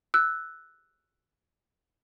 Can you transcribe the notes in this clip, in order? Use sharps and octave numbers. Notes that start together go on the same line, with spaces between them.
E6 F#6